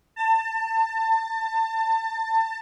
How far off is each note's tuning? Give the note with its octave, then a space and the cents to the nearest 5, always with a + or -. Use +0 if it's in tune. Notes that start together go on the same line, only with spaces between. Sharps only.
A5 +30